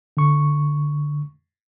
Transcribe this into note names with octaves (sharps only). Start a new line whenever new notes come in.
D3 C#6